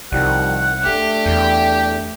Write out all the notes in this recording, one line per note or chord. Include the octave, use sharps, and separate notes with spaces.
C2 D#3 F3 G3 F#5
A3 D4 G4
E2 G5